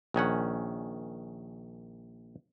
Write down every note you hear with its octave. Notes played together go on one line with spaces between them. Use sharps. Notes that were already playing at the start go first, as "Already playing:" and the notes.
A#1 D#3 C#4 F#5